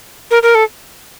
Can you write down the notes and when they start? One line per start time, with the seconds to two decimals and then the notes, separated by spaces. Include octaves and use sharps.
0.31 A#4
0.43 A#4
0.55 A4